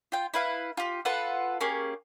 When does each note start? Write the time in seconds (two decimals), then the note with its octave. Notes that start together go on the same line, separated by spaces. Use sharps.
0.12 F4 G5
0.34 E4 B4 F5
0.77 F4 G4
1.05 F4 A4 B4 F#5
1.60 A#3 C#4 G4 G#4